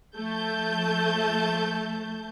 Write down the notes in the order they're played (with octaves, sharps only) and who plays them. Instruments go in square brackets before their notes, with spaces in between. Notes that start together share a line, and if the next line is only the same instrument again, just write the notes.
[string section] F3 A3 A5 G6